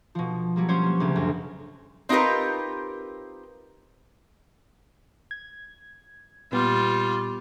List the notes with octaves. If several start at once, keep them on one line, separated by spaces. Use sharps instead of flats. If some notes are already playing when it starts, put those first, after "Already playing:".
B2 F3
F#3 G3 A#3
G3 C#4 C5 C#5
A#3 B3
D2 C#3
B1 F#2
C4 D#4 F4 G4 A#4 B4
G#6
A#2 G3 B3 F4